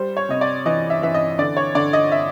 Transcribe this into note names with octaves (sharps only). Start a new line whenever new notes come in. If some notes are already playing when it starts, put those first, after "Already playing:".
Already playing: G3 C5
C#5
C3 D#5
D5
E3 D#5
E5
E3 E5
D#5
D3 D5
C#5
D3 D5
D#5
E5